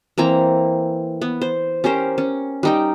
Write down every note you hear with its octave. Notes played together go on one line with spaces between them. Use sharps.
E3 A#3 C4 A#5
B3
C5
C#4 G4 A#4 C5
C#4
G3 D#4 G5